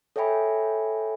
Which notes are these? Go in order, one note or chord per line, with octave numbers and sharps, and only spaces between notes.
A4 C#5 E5 G5 G#5 B5